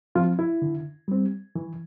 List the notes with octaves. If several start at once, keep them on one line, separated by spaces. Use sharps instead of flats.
F3 C4 F4
E4
D3
G3 C4
E3